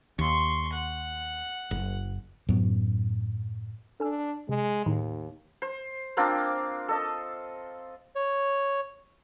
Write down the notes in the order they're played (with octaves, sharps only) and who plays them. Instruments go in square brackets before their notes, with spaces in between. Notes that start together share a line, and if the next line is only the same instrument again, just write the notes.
[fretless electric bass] D#2 [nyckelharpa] C6 C#6
[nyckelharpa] F#5
[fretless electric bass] F#1
F#2 A2 F#3 B3
[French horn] D4 [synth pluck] A4 G#5 E6
[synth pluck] C3 [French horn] G#3
[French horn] D#2 [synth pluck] A2 D#3 D#4
[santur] C5
A#3 C4 D4 F4
A4 D#5 A5
[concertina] C#5